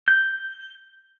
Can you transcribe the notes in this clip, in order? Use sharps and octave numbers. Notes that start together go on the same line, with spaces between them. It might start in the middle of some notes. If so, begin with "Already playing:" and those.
G6